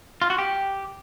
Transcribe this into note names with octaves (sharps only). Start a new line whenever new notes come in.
F4
F#4
G4